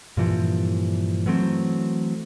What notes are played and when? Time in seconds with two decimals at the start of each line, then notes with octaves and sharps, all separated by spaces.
0.17 G2 A#2 E3 F3
1.26 E3 F#3 A3 C4